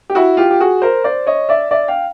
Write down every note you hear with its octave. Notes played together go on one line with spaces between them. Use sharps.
G4
E4 F#4
F4 G4
G4
F#4 G#4
A#4 C5
C5 D5
C#5 D#5
D5 E5
D5 E5
F5 G5